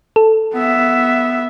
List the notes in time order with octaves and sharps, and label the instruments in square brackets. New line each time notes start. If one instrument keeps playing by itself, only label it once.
[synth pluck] A4
[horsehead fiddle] B3 E5